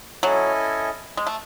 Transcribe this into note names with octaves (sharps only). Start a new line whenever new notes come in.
F#3 C#4 E4 A4 D#5 G#5
G#3
A3